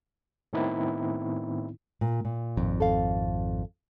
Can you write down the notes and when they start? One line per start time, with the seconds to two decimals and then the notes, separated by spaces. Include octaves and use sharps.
0.53 A2 D#3 B3 C4 D#4 E4
2.01 A#2
2.25 A#2
2.57 G#1 F2
2.80 A4 F5